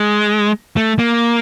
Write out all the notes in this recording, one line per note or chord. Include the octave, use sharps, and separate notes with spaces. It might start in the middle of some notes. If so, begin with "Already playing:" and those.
Already playing: G#3
A3
A#3